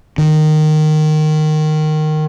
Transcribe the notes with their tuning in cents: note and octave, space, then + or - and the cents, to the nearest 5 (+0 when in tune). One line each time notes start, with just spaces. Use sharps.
D#3 -15